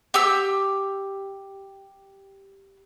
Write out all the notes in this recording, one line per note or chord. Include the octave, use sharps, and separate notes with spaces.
G4 E6